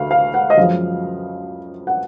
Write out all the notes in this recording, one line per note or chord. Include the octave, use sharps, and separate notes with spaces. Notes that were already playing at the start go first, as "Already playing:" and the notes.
Already playing: D2 F5
F5
F#5
D#5
F#2 F3 G#3 F5
F#5